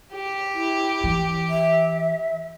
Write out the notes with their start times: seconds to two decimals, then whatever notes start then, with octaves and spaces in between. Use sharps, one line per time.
0.13 G4
0.54 E4
1.04 E3
1.49 E5